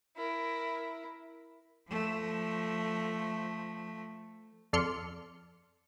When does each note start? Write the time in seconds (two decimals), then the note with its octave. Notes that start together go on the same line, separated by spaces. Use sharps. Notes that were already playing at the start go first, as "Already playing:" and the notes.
0.17 E4 A#4
1.88 F3 A3
4.73 F2 A4 D5 C6 F6 C#7